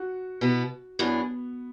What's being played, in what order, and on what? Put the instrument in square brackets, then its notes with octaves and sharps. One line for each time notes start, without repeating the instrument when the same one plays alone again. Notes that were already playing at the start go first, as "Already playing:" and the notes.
Already playing: [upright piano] F#4
[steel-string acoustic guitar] B2 B3 E4
[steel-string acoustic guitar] F#2 E3 D4 [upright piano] B3